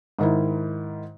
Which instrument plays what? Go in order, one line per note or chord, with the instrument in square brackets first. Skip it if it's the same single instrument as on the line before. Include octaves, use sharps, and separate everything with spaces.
[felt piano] G#2 D#3 E4